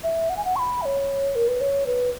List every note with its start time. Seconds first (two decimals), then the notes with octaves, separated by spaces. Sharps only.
0.03 E5
0.29 F#5
0.37 G#5
0.45 F#5
0.56 C#6
0.59 B5
0.82 E5
0.85 C#5
1.35 A#4
1.48 B4
1.61 C#5
1.87 B4